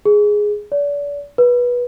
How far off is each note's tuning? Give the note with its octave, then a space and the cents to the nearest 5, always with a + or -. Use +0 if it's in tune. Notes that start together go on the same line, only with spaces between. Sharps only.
G#4 +0
D5 -35
B4 -20